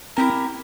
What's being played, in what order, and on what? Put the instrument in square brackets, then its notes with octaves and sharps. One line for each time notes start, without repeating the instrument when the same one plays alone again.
[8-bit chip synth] C4 [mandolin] E4 G4 A#4